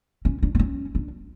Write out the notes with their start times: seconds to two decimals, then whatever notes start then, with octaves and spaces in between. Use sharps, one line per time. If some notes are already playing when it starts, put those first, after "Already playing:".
0.25 C#4
0.43 D4
0.55 B3
0.59 C#4
0.95 D4